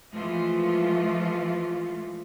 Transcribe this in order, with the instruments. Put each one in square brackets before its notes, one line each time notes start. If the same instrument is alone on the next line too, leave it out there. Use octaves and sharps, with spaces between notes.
[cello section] E3 F3 G#3 A3 F4